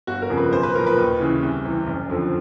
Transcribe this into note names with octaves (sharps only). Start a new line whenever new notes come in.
G1 F#4
A#4
F2 C#3 F3
B4
B1 C5
B4
A#2 F3 A#4
B4
D#2
C#3 E3
C2
C3 E3
F#1
F2 D3 F3